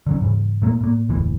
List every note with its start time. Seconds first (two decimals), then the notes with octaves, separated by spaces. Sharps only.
0.07 D3 F#3 C#4
0.21 G#2 C#3 E3
0.62 A#2 A3 A#3
0.81 A2 A#3
1.09 F1 D2 A2 E3